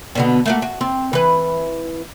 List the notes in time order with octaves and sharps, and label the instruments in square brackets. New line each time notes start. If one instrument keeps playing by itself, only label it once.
[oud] B2 D3 B3
A3 A#3 F#4
F#4
C4
E3 B4